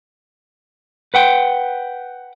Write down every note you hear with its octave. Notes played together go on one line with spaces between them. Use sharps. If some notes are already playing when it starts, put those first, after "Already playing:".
B4 F#5 G5